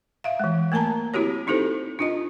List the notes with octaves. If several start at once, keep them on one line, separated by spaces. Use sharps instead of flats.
E5 F5
E3 G#3
A3 A#3 A#4 A5 A#5
C4 E4 F#4 G4 C#5
C4 D#4 E4 G4 A4 C5
D4 F4 D#5